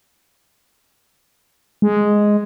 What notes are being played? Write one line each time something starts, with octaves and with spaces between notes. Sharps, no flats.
G#3